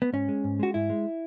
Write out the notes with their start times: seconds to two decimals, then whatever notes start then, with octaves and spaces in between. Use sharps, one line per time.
0.02 B3
0.13 G#2 C#4
0.29 G#3
0.44 G#2
0.59 G#3 F#4
0.74 G#2 E4
0.90 G#3